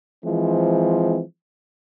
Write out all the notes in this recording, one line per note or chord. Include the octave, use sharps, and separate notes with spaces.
E3 F3 G#3 C4